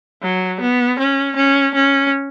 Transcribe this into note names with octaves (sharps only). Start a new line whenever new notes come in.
F#3
B3
C#4
C#4
C#4